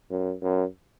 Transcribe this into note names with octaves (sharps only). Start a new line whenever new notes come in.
F#2
F#2